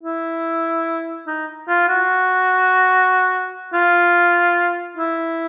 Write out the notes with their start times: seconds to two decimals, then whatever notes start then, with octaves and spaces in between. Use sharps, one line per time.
0.03 E4
1.27 D#4
1.69 F4
1.89 F#4
3.74 F4
4.97 E4